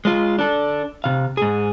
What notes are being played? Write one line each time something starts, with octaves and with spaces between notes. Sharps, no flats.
G#3 F4
D4 A4
C3 F5
G#2 G#4